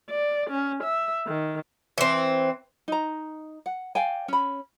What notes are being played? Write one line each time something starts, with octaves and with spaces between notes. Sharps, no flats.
D5
C#4
E5
D#3
E3 C4
D#4 A#5
F#5
D5 F5 G5 G#5
C#4 B5